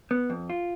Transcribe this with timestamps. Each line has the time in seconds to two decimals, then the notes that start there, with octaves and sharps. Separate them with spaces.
0.11 B3
0.30 F2
0.50 F4